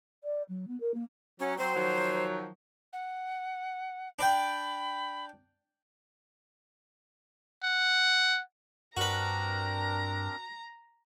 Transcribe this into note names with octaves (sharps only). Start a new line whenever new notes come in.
D5
F#3
B3
A#4
A#3
F#3 C#4
F#3 C4 C5
D#3 F3 F#3
F#5
D4 D5 G5 B5
F#5
G2 C4 D4 F#4 A#4 B4 A#5